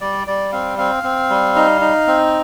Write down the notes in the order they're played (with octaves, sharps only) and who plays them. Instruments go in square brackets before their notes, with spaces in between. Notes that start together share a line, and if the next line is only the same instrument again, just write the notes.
[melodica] G3 D5
G3 D5
C4 F5
C4 F5
C4
G3
D#4
D#4
C4